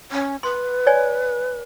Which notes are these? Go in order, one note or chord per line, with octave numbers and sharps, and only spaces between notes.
C#4
B4 C6
C#5 D5 G#5